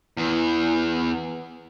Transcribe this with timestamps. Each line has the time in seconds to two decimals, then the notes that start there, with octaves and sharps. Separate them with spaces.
0.17 E2 E3